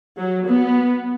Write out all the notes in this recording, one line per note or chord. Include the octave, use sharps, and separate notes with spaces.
F#3
B3